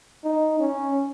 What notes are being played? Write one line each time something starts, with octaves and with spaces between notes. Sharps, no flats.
D#4
C#4